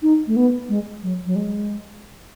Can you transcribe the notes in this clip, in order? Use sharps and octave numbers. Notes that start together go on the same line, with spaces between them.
D#4
A3
B3
G#3
F#3
F#3
G#3